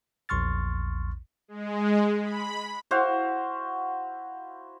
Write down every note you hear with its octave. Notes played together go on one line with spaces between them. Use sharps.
A#1 E2 C6 C#6 F6 A6
G#3
B5
E4 F#4 C5 F5